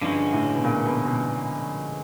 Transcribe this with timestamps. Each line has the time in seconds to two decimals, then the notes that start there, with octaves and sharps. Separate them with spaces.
0.01 G2 D3 F3 G#3 C#4 F#4
0.33 A2
0.55 B2
0.64 A#2
0.86 B2
1.06 B2